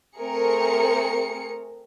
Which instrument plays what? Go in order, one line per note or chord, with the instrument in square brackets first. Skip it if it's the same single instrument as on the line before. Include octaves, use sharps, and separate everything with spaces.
[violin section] A3 C4 G#4 A#4 C#7